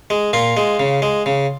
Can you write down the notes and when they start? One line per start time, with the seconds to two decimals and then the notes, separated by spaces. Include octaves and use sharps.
0.10 G#3
0.33 A#2 F4
0.57 G#3
0.80 C#3
1.02 G#3
1.26 C#3